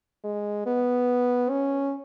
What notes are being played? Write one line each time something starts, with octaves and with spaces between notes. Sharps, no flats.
G#3
B3
C#4